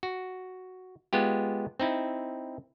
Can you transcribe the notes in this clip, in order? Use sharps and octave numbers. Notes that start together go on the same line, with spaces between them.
F#4
G#3 B3 F4 G4
C4 D#4 E4